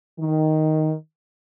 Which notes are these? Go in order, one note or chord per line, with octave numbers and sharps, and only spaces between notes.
D#3